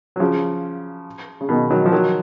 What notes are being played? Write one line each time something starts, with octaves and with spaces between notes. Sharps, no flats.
F#3
C#3 F3
C#3
B2 D#3
D#3 F#3
F3
D#3 F#3